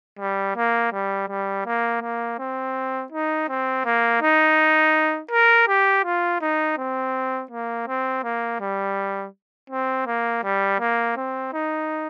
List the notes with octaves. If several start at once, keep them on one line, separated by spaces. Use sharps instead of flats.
G3
A#3
G3
G3
A#3
A#3
C4
D#4
C4
A#3
D#4
A#4
G4
F4
D#4
C4
A#3
C4
A#3
G3
C4
A#3
G3
A#3
C4
D#4